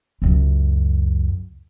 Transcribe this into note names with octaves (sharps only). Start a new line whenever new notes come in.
C#2 F#2